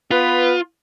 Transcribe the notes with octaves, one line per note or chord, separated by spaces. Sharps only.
B3 F4 B4